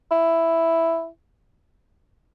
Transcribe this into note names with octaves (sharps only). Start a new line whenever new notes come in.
E4